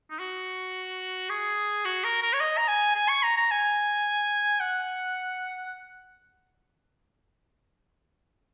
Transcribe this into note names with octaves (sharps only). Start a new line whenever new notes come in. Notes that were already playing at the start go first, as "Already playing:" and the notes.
D#4
F#4
G#4
F#4
A#4
A#4
C#5
D#5
A#5
G#5
G#5
C#6
A#5
A#5
G#5
F#5